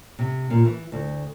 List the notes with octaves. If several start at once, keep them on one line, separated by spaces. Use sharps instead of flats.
C3
A#2
E3
D2